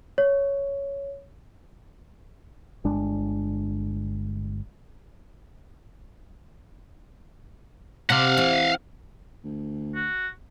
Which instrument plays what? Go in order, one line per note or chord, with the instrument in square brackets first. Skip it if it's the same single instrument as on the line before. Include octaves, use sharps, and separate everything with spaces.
[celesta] C#5
[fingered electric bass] G1 G#3 D4
[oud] C3 [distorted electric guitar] F5 F#5
[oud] E3
[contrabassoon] D2
[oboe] F#4